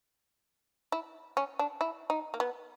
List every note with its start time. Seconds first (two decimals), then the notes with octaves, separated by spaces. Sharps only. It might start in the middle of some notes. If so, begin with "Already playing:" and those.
0.92 E4
1.37 C#4
1.59 D4
1.81 E4
2.10 D#4
2.34 A#3
2.40 B3